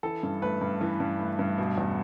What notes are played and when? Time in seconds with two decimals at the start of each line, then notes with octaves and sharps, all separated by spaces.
0.03 E3 A4
0.23 G2
0.42 A3 B4
0.61 G2
0.81 E3
1.00 G2
1.20 A3
1.39 G2
1.58 B2
1.78 E2